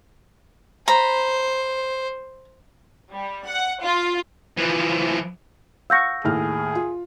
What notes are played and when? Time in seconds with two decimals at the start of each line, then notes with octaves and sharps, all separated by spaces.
0.88 C5 A#5 B5
3.13 G3
3.45 F#5
3.82 F4
4.58 E3 F3
5.90 F5 F#5 C#6 E6 G6 A#6
6.24 D#2 A2 G#4 F6
6.75 F4